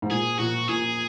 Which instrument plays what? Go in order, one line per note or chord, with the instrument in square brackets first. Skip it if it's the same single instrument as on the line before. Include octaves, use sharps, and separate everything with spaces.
[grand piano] G#2
[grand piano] A#2 [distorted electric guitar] G#4
[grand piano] A#2 [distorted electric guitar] F#4
[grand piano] A#2 [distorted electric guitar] G#4